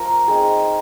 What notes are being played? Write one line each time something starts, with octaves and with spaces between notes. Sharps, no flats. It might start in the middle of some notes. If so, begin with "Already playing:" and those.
Already playing: F3 A#4
C4 D#4 G#4